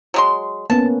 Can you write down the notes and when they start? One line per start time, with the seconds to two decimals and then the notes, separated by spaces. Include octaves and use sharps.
0.14 F#3 G#3 C6
0.70 A#3 B3 C#4 A5